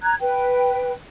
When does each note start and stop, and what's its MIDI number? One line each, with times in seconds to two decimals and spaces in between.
0.02 0.15 82
0.02 0.15 90
0.02 0.15 92
0.21 0.93 71
0.21 0.93 79